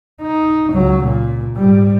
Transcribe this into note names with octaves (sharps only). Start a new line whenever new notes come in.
D#4
C#2 F#3
A#2
G#2 G3